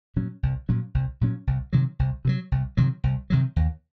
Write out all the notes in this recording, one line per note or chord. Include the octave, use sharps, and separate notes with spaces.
A#2 F#3 C#4
C2
A#2 F#3 C#4
C2
A#2 F#3 C#4
C2
C3 D#3 F#3
C2
C3 D#3 F#3
C2
C3 D#3 F#3
C2
C3 D#3 F#3
D#2